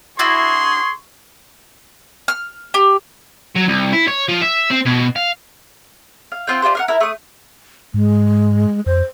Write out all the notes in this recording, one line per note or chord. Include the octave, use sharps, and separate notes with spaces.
D4 E4 F#4 G#4 C6 C#6
F6
G4
F#3
C2
E4
C#5
F3
E5
C4
B2
F5
F5
C4 F4 F#5 G5
D4 F4 G4 C5
A#4 F5 F#5
E4 A#4
A3 D#6
G#2 G#3
F2 C5